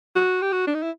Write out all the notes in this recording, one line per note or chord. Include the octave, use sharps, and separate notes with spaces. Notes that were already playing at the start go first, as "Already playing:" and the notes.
F#4
G4
F#4
D4
D#4
E4